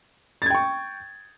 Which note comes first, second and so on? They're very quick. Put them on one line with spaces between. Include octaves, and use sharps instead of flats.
A6 G#6 G5 C#6